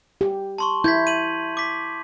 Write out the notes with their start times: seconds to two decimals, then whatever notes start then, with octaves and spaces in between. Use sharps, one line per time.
0.21 G4
0.58 A5 C6 C#6
0.84 E4 G6 G#6 B6
1.07 D#7 F#7
1.57 D6 B6